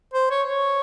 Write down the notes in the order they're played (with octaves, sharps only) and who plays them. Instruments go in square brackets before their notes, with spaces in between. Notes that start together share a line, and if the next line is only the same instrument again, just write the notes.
[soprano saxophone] C5
C#5
C#5